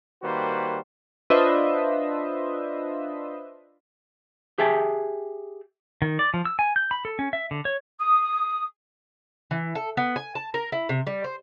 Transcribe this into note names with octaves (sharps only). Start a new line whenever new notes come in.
D#3 G3 A#3 F#4 B4 C5
D4 F4 B4 C5 D#5 E5
G4 G#4 E5 G5 A5
D#3
D5
F3
E6
G#5
G6
B5
A4
C#4
E5
D3
C#5
D#6
E3
A4
B3
G#5
A5
A#4
E4
C3
G3
C5